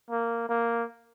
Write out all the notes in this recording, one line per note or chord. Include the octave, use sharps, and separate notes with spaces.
A#3
A#3